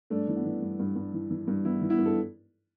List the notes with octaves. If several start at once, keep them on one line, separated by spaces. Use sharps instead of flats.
G2 A3 D4
E3
B3
E3
G2
G2
G2
E3
E3
G2
E3 B3 E4
E3
B3 E4
G2
A4